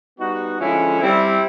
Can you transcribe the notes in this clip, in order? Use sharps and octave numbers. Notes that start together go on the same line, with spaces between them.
G3 B3 D#4 F#4
D3 F3 G#3 C#4 E4
G3 C4 E4